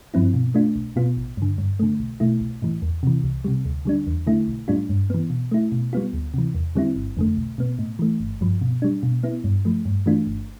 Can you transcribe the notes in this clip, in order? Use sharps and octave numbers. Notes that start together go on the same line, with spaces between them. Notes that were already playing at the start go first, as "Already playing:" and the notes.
G2 F3 C4 E4
B2
A3 D4 F4
B1
B2 B3 F4
A1
G2 D3
G2
D3 A3
B1
B2 A3 E4
B1
A2 E3
E2
C3 E3
C2
C3 G3
D2
D3 G3 D4
E2
D3 A3 E4
B1
A2 G3 D4 F4
G2
E3 B3
B2
A3 E4
B2
G3 B3 F4
D2
C3 E3
E2
D3 G3 C4 E4
G1
F2 D3 A3
B1
B2 B3
A2
E3 A3
G1
G2 F3
B2
G3 D4
B2
B3 E4
G2
F3 A3
G2
E3 A3 D4 F4
G1